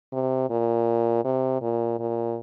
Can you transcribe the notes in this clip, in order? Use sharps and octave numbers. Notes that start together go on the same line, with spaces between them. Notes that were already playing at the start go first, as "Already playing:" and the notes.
C3
A#2
C3
A#2
A#2